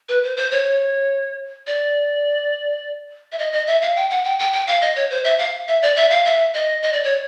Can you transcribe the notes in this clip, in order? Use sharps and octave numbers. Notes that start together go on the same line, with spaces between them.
B4
C5
C5
C#5
D5
E5
D#5
D#5
E5
F5
G5
F#5
G5
G5
G5
F5
D#5
C#5
C5
E5
F5
E5
D5
E5
F5
E5
D#5
D#5
D5
C#5